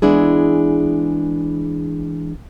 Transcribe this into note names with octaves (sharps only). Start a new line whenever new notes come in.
E3 G#3 B3 D4 E4 G#4